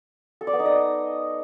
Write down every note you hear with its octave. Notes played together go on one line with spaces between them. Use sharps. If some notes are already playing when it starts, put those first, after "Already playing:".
A4
D5
B3
D#4
D#5